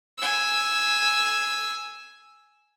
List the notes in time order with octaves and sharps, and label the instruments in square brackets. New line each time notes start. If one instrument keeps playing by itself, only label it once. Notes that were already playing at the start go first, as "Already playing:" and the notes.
[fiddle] G#5 E6